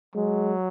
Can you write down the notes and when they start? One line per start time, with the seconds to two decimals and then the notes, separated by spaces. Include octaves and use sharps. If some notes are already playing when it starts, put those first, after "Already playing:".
0.15 F#3 G#3